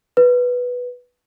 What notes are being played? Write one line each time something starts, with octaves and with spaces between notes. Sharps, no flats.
B4